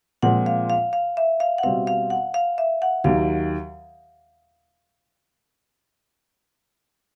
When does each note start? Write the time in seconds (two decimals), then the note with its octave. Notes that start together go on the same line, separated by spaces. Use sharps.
0.22 A#2 F3 G#3 C4 F#5
0.46 F5
0.70 F5
0.93 F5
1.17 E5
1.40 F5
1.58 F#5
1.63 B2 G3 C4 F5
1.87 F5
2.10 F#5
2.34 F5
2.58 E5
2.82 F#5
3.04 D#2 D#3 F#3 F5